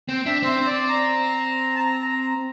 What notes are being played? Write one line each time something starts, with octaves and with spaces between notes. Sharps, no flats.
C4 G5
D4 E5
C4 C5
D5
A#5
A5
A#5
A#5